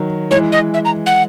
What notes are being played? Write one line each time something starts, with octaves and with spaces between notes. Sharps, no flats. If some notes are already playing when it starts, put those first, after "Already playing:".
Already playing: D#3 F#3
E3 G#3 C#5
D#5
E5
A#5
F#5